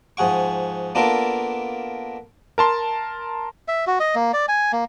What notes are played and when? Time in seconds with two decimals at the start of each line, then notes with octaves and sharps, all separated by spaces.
0.17 G#2 F3 G#4 F#5 C#6
0.95 A#3 B3 D4 F4 A4 A#4
2.58 A#4 A5 C6
3.68 E5
3.87 F#4
4.00 D#5
4.15 A#3
4.33 D5
4.48 G#5
4.72 A#3